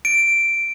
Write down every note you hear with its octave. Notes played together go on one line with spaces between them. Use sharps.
D7